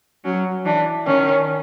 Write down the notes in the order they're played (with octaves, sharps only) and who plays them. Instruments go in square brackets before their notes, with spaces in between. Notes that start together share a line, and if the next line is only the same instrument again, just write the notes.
[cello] F#3 [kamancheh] C#4
[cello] E3 [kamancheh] D4
[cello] D#3 [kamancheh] C#4